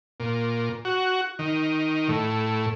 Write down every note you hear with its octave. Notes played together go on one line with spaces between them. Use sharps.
A#2
F#4
D#3
A2